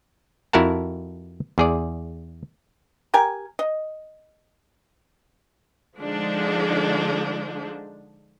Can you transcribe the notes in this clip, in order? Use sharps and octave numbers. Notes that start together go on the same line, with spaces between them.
F2 E4 F#4 A#4 F#5 A5
E2 G#4 D5
G4 A#4 G#5
D#5
D3 F3 G#3 D4 D#4